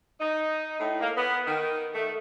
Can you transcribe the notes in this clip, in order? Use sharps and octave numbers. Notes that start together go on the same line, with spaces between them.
D#4
A2
A#3
B3
D#3
A3